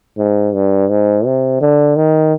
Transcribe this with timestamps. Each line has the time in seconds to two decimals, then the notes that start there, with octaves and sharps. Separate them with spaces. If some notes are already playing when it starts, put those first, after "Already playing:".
0.18 G#2
0.54 G2
0.90 G#2
1.25 C3
1.61 D3
1.96 D#3